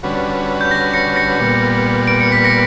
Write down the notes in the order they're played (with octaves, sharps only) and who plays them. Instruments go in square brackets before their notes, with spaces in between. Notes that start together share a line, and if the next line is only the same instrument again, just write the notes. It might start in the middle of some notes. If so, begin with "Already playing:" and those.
[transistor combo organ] D3 G3 C#4 F#4 B4
[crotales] G6
A#6
A#6 C#7
A#6 C#7
[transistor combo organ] A#2 G3 B3
[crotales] D7
C#7
B6
A#6 C#7